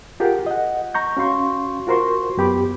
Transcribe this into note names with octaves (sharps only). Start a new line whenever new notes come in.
F4 G4 G#4 A#4 F#5 G5
D#5 F#5
A#5 C#6 G6
C#4 F#4 F5 C6 C#6
F4 F#4 A#4 C5 C6 C#6
F#2 B3 G4 B5 D6